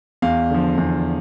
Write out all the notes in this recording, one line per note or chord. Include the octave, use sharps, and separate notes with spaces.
E2 F5
D3 F3
E2